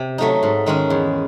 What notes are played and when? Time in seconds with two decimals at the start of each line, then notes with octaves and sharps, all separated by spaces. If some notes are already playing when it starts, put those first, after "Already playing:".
Already playing: C3
0.18 F#3 A3 D#4
0.43 G#2
0.66 D#3 G#3 C#4
0.90 E2